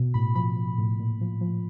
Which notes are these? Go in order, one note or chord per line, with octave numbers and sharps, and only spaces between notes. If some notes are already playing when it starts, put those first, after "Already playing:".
Already playing: B2
A2 B5
F3 B5
F3
A2
A#2
F3
F3